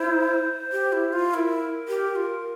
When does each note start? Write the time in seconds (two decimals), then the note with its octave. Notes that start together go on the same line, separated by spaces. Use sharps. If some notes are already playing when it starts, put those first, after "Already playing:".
Already playing: E4 C5
0.72 G4
0.92 E4
1.13 F4
1.34 E4 A#4
1.88 G4
2.16 F4